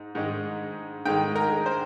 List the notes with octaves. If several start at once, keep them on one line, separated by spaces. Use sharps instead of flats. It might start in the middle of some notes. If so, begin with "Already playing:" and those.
Already playing: G#2
G#2 D#3 G#3
G#2 D#3 G#3 G5
A#4
C5